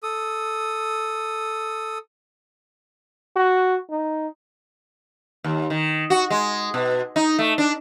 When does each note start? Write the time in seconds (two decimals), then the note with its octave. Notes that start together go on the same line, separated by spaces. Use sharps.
0.03 A4 D#6
3.36 F#4
3.90 D#4
5.44 D#2
5.70 D#3
6.10 F#4
6.30 G#3
6.74 B2
7.16 D#4
7.38 A3
7.58 D4